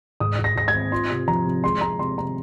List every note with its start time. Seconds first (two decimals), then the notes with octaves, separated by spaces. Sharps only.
0.20 G#2 D#6
0.39 G#2
0.44 A#6
0.56 G#2 A#6
0.68 G#6
0.73 C4
0.92 F4 C6
1.10 C3
1.27 F3 A#5
1.46 C3
1.63 G#3 C6
1.81 G#3 A#5
1.99 C3 C6
2.17 C3 A#5